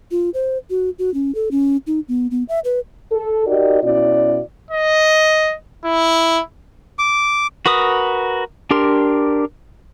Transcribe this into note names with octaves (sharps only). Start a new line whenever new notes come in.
F4
C5
F#4
F#4
C#4
A4
C#4
D#4
B3
B3
E5
B4
A4
D#4 F#4 G4 A#4 D5 D#5
B2 C#4 E4 F#4 D5
D#5
E4
D6
F#4 A#4 B4 D#6
D4 G4 A#4 C6